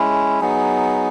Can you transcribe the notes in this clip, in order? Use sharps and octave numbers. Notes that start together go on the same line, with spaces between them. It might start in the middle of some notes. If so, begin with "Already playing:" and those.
Already playing: G#3 C#4 E4
F#3 B3 D#4 G#4